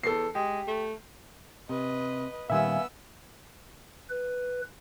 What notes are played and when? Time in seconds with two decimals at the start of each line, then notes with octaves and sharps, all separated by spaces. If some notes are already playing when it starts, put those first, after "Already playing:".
0.04 E2 A4 C7
0.35 G#3 G4
0.68 A3
1.69 C3 B4 D#5
2.50 A#2 D#3 G3 B3 E5 F5 G#5 E6
4.09 B4